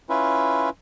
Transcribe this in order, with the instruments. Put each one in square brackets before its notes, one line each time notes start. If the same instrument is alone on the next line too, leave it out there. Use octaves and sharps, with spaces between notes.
[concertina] C#4 E4 F4 B4